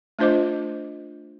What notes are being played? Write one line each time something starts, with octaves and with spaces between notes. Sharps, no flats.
A3 D4 F4 C5 D#5 D6